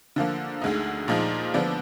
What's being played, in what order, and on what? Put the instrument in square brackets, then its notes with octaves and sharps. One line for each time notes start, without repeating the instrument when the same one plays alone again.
[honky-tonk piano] D3 F3 A#3
D2 D3 G#3 D#4
A#2 F3 G#3 D#4
D3 F3 B3 D4